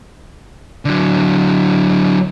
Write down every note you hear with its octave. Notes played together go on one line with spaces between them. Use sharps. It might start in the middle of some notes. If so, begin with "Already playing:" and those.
D3 F#3